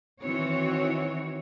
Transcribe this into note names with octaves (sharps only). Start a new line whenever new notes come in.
D#3 E3 C4 F#4 C#5